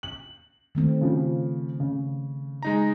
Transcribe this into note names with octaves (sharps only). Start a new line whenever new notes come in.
F#7
D#3 A3 C4
C#3 F3
C#3
G#3 D#4 A#5